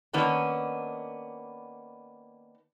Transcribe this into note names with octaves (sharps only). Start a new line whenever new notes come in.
D#3 A#3 B3 C#4 D4